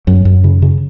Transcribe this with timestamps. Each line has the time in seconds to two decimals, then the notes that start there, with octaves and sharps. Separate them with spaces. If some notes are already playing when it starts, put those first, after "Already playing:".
0.07 F#2 F#3
0.25 F#2
0.44 C#3
0.62 C#3